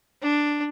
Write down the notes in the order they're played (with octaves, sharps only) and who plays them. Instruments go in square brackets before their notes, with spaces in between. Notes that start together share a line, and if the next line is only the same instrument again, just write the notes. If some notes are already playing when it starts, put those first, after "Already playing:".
[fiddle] D4